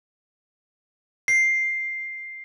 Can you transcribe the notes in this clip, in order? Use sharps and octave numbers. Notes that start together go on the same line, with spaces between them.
C7